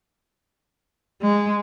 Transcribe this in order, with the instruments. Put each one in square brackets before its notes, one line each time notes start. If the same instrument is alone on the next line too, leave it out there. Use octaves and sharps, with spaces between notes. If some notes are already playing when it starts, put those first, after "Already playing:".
[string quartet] G#3